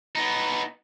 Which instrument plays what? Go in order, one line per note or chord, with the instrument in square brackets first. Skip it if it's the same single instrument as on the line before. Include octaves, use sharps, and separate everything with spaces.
[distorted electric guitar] B3 D#4